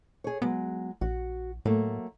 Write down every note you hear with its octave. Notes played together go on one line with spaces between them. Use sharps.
G#4 C#5
F#3 G#3 B3
A#1 F#4
A2 F#3 A3 A#3